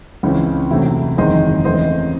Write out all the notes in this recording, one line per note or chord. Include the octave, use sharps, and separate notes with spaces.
C#2 C#3 E3 C4
E2 C3 F#3 A3 C4 E4
F#1 E2 D#3 G#3 C4 C5 D#5
E2 C#3 E3 A3 C4 C5 D#5